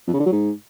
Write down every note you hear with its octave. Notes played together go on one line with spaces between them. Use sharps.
F2
C#3
D3
F#3
G#2